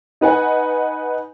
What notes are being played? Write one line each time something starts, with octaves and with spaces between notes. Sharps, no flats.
D#4 B4 F#5 G#5